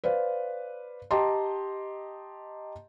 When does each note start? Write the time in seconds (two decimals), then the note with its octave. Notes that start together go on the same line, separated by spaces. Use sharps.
0.04 B4 C5 D5 F5
1.11 G4 D#5 G5 A5 A#5 C6